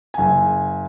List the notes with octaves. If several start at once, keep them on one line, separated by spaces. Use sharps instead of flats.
F#1 G#5